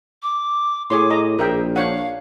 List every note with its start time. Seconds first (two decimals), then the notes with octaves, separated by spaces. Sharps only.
0.23 D6
0.90 A2 G#4 C#5 C6 D6
1.10 G#4 D#5 A#5
1.39 A#1 G#4 A#4 E5 G5
1.76 D4 C#5 F5 F#5